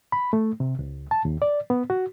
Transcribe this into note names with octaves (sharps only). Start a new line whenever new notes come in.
B5
A3
C3
C#2
A5
D#2
D5
B3
F#4